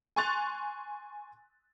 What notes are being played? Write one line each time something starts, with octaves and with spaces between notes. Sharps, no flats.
G#5 C6 C#6 F#6 A6 F7